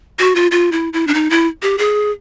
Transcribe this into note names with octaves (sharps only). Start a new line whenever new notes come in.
F#4
F4
F4
E4
E4
D4
D#4
E4
G4
G#4